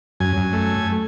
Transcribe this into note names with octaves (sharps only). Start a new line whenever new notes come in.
F#2 G#5
F#2
A3